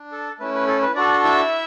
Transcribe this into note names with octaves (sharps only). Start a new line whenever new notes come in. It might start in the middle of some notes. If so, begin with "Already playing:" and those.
Already playing: D4
A4
A3 C#4 E4 B4
B4
A4
B4
D4 F#4 A4 D5
E4 E5